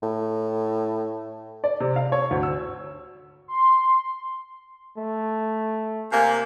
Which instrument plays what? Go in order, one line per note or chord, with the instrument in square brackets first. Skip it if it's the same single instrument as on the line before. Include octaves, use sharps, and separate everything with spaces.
[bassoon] A2
[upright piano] D5
C3
F5
C#5
D2
E6
[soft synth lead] C6
[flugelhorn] A3
[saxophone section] C3 A#3 [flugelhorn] G#5